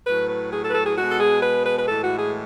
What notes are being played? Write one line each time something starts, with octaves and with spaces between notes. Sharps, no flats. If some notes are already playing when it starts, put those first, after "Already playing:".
A2 F#3 B4
B4
G#4
A4
B4
A4
G#4
B2 G#3 F#4
A4
G#4
B4
B4
B4
A2 E3 G#3 A4
F#4
G#4